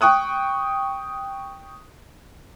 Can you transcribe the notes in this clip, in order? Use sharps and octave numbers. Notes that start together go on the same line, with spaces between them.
G5 C#6 D#6 F#6